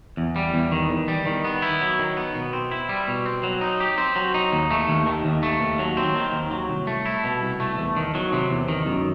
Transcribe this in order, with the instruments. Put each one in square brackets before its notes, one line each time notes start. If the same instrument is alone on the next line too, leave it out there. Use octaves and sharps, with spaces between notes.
[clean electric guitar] E2
G3
E2
D#3
E2
G3
D#3
B3
E4
F#3
D#3
B3
B2
C4
E4
G3
B2
C4
F#3
D#4
G4
C4
F#3
D#4
D#2
A3
D#2
D#3
D#2
A3
D#2
F#3
C4
D#3
D#2
F#3
C2
A3
E4
B2
C2
A3
E2
D#3
F#3
C3
E2
D#3
F#2